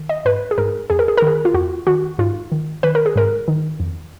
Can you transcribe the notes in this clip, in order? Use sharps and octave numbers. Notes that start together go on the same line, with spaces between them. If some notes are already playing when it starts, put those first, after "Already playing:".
Already playing: D#3
D#5
G#2 B4
G#4
G#2 A#4
F2 G#4
A#4
G#4
A#4
D#3 G#4
F4
F2 F#4
D#3 F#4
G#2 F4
D#3
D#3 B4
A#4
G#4
G#2 A#4
D#3
F2